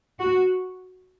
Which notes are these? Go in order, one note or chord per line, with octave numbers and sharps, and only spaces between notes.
F#4